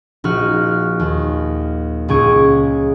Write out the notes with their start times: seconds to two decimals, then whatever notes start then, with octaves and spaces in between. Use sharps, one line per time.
0.24 A#1 D#4 F#4 F6
0.99 D#2
2.08 C#2 A#2 G#4 C#6 G#6 D7